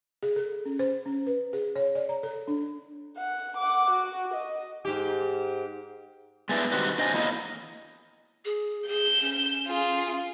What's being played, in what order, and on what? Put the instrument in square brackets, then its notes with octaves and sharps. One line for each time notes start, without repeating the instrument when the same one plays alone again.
[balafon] G#4
A4
C#4
C5
C#4
B4
G#4
C#5
D5
A#5
A4
D4
[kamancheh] F#5
F#5 D6
F#4
D#5
[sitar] G#2 G4
[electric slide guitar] G#3 A3 B3 D4 E4
D#3 G3 C4 F#4 G4 B4
D4 C5 D#5 G#5
E2 F#3 A#3 E4 D#5
[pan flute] G#4
[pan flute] G#4 [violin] G6 E7
[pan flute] C#4
[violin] F4 G#4